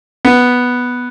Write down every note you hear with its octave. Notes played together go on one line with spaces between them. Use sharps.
B3